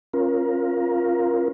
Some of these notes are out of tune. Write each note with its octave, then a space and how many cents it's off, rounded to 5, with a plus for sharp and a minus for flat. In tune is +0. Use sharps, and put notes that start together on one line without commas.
C#4 -30 F4 +0 A#4 +20